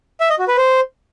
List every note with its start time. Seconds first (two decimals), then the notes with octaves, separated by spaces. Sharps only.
0.20 E5
0.30 D#5
0.39 F#4
0.48 B4
0.57 C5